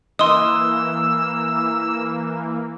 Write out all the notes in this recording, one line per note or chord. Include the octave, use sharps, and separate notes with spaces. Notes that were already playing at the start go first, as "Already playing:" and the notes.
E3 A#3 D#5 C6 D#6 E6